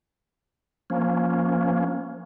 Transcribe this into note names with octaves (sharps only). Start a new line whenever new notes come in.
F3 A#3 C#4